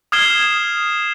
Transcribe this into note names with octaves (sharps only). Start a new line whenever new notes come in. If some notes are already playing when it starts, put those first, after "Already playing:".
D#6 F6 G#6 C7 E7 G7